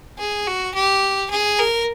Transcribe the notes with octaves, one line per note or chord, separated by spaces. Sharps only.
G#4
F#4
G4
G#4
A#4